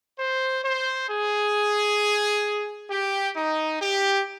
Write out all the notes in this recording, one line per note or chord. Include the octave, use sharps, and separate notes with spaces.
C5
C5
G#4
G4
D#4
G4